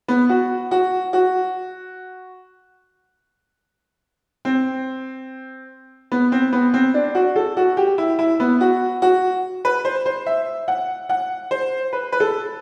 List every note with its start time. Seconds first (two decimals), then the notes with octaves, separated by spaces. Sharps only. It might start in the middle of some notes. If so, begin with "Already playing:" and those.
0.08 B3
0.29 F#4
0.71 F#4
1.13 F#4
4.45 C4
6.12 B3
6.32 C4
6.53 B3
6.74 C4
6.94 D4
7.15 F#4
7.36 A4
7.57 F#4
7.77 G4
7.98 E4
8.19 E4
8.40 B3
8.61 F#4
9.02 F#4
9.65 B4
9.85 C5
10.06 C5
10.26 E5
10.68 F#5
11.09 F#5
11.51 C5
11.93 B4
12.12 B4
12.20 A4